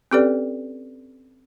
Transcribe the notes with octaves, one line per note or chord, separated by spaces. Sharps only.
C4 C#4 G4 A4 B4 D5